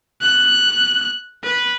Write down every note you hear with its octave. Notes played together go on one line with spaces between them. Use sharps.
F#6
B4